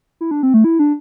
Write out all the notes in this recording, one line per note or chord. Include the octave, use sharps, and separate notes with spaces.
E4
D4
C4
A3
E4
D4